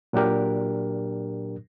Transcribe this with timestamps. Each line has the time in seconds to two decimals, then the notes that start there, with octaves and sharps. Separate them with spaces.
0.13 A#2 F#3 D4 G4 A#4